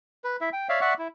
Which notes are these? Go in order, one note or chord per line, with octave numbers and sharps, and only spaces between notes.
B4
E4 E5
G5
C#5 D5 E5 F5
D5 E5 F#5 C#6
E4